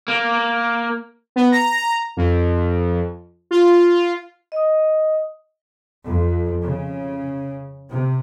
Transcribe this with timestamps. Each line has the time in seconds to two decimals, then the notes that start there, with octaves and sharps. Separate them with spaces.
0.08 A#3
1.36 B3
1.52 A#5
2.17 F2
3.51 F4
4.52 D#5 D#6
6.05 F2
6.62 C#3
7.90 C3